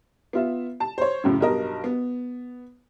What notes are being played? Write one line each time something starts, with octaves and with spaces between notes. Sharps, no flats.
B3 F4 E5
A5
C5 C#5
F#2 A2 C#3
B1 G2 A#4 D#5
B3